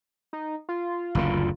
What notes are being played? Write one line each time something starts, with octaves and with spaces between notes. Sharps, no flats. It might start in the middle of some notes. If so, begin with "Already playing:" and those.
D#4
F4
F#1 D2 D3